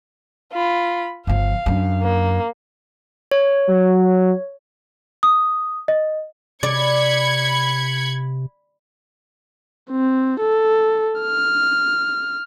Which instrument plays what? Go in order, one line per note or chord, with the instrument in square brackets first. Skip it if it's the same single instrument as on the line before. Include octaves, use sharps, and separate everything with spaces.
[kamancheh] F4 B5
[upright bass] G1 F3 [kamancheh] F5
[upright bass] F#2 D4
[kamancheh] A#3
[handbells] C#5
[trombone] F#3
[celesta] D#6
D#5
[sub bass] C3 [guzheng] D5 [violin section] B5 G#6 C#7
[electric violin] C4
A4
F6